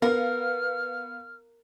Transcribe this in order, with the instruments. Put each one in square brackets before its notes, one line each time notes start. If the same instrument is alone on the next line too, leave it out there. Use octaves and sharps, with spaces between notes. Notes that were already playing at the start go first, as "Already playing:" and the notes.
[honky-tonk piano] B3 F5 [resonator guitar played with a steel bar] A#4 [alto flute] B4 [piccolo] F6